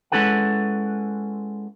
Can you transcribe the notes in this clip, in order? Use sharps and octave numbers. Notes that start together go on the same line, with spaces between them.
G#3 C#4 E4 A4 B4 F#5